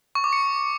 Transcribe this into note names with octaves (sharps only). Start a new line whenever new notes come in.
C#6
D6
C#7